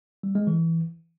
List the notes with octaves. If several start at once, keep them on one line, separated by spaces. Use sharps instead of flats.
G3
G#3
E3